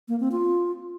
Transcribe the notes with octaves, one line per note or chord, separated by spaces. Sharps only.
A#3
C4
F4